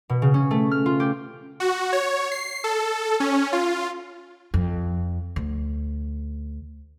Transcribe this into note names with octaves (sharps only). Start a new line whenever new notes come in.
B2
C#3
C#4
A3
F6
F4
G4
F#4
C#5
C7
A4
C#4
F4
F2
D2